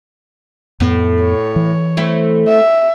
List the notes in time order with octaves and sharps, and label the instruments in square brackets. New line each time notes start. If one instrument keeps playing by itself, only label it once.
[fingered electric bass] F2 B3 [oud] A2
[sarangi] C#5
[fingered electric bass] E3
[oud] A3 C4 E4
[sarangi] E5